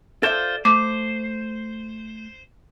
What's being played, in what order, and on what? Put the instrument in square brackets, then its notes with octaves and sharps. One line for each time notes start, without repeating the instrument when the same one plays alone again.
[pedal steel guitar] F4 C5 [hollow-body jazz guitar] A4 D5 E5
[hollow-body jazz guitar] A3 [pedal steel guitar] C5 [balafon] D6